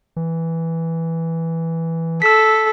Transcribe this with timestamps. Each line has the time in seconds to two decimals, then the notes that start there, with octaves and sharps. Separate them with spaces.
0.16 E3
2.22 A4 E6 B6